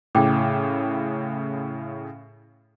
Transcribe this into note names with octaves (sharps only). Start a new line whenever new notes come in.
A2 C#3 G5 D6